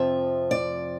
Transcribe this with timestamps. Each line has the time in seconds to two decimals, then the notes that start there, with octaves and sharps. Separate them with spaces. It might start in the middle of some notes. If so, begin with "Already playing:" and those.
Already playing: F2 C3 F3 E5
0.51 D5